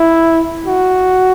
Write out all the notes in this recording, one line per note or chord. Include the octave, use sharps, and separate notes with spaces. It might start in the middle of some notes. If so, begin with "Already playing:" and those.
Already playing: E4
F#4